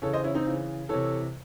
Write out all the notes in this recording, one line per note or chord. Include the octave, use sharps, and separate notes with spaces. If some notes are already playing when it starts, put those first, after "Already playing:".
C#3 E3 A4 C#5
C5 D#5
C#4 E4
C4 D#4
C#3 E3
C3 E3 A4 C#5